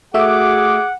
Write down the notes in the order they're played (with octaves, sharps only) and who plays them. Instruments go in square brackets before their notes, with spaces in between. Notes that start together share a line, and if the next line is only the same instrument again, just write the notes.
[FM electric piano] A3 F#4 E5 [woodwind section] G#4 D6 [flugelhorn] F#5